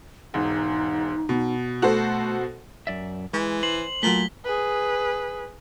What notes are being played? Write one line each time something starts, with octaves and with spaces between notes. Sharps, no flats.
E1 G#2 D#4
B2
A3 F#4 A4 C5
F#2 D5 E5
E3 G#3
C5 F#7
A#2 F#3 A3 B6 G7
G#4 B4